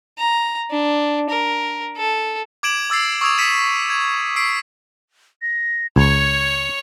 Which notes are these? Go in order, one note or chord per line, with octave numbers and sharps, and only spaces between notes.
A#5
D4
A#4
A4
D6 G#6 D7 E7 F#7
D6 E6 A6 C7
C#6 D#6 E6 G#6 D7 F7
E6 B6 C#7 D#7 E7
G#6
E6 B6 C7 D7
A#6
C#2 C#5 C#6 G#6